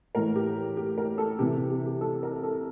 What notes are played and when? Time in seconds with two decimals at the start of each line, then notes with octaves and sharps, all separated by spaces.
0.15 A2 E3 A#4
0.36 G4
0.77 G4
0.98 A#4
1.18 A4
1.39 C3 E3 G4
1.70 G4
1.86 G4
2.01 A4
2.23 A#4
2.43 A4